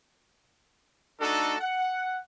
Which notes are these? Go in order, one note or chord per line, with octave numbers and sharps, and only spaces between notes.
A3 D4 D#4 F#4 A4
F#5